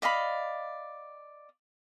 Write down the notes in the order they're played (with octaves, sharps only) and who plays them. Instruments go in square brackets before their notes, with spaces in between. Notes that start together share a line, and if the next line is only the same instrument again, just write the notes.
[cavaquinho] D5 D#5 F5 B5